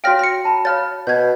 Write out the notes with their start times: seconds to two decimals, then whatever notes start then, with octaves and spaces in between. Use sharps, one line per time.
0.04 F#4 C#5 F5 G5 F6 A#6
0.19 A#6 C#7
0.45 A5 B5
0.65 C#5 F5 B5 F6 A6
1.07 B2 G6 G#6